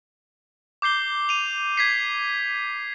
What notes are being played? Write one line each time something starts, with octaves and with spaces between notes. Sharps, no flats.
D6 G6 C7 G7
D#7 F7
G#6 B6 C7